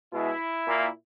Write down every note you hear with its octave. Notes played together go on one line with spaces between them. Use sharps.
B2 G#3 E4
A#2 A#3